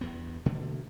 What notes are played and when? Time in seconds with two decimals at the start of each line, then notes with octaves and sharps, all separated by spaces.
0.01 E2 G2 B3
0.46 B2 D3 A3 A#3